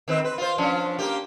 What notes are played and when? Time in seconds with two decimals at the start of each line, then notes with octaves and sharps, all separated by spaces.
0.08 D#3 C4 B4
0.24 B4
0.38 F4 C5
0.58 F3 C#4 D4
0.99 A#3 G4